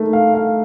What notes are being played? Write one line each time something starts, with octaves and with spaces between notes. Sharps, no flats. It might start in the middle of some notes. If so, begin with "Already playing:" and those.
Already playing: A3 D#4 A#4
F5
F5